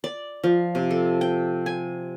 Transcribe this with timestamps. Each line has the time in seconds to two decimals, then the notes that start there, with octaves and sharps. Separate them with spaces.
0.04 D5
0.44 F3
0.75 C3
0.91 A4
1.21 G5
1.66 G#5